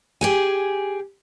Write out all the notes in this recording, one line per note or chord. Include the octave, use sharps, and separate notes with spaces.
G4 G#4 G#5